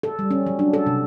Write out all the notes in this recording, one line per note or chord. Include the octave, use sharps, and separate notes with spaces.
A4
G3
C#4
F#3
D4
A4
C3